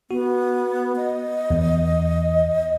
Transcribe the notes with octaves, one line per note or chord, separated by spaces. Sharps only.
B3 F#4
D#5
E2